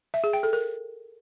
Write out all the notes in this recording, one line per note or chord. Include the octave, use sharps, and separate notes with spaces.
E5
G#4
G5
A4
A#4